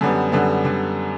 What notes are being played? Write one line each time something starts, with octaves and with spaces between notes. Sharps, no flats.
F#2 D3 G3 B3
F#2 D3 G3 B3
D3 G3